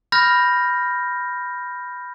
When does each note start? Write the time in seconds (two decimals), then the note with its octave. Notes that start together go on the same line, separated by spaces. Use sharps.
0.12 B5 F6 G6 A#6